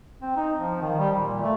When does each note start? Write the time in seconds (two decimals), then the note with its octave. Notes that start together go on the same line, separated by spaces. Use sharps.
0.22 C4
0.36 D#4
0.59 F3
0.81 D#3
0.98 G3
1.17 A#2
1.41 A3